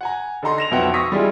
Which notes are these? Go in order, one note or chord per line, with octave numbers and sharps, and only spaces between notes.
F#5 G#5 A#5
D3 D#4 A4 A#5 C6
A#6 E7 F7
B1 F2 B3 E5 F#5 G5
C#6 D#6 E6 A#6 B6
G3 G#3 D4 E4 F4 G#4